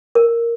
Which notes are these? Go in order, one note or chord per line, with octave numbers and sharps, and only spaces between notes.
A#4